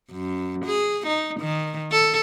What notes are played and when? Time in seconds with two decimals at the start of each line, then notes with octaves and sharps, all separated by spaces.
0.11 F#2
0.65 G#4
1.07 D#4
1.40 D#3
1.91 A4